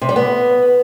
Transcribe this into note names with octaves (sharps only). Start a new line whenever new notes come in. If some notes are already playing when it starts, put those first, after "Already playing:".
C3
G3
B3